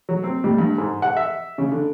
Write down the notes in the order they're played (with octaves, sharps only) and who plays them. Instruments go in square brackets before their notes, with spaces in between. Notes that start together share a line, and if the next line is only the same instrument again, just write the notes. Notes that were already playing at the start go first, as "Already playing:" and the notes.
[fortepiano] F#3
C4
G3
G2
G#2
F#5
E5
C#3
D3